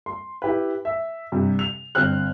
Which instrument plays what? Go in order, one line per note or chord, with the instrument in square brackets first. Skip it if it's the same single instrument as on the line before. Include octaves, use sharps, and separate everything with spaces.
[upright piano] C6
E4 G4 B4
E5
G2 C3
F7
G1 C4 F6 F#6